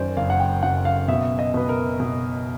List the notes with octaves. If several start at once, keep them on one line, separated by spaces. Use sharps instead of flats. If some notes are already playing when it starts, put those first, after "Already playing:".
Already playing: F#2 D#3 C5 D5
F#1 F5
F#5
G5
F#2 F#5
F5
B2 E5
D#5
B2 B4
A#4
B2